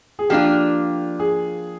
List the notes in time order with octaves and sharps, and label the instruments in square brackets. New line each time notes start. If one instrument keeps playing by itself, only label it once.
[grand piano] G#4
[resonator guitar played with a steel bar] F3 A#3 D4 F4 [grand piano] G4
[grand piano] G#4